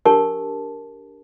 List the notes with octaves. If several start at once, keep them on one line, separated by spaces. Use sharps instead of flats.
D4 G4 A#4 A5 C#6